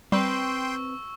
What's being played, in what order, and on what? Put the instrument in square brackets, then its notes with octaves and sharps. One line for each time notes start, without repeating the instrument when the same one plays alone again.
[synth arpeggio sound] G3 [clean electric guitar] C4 B4 [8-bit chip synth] G5 C6 [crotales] C#6 E6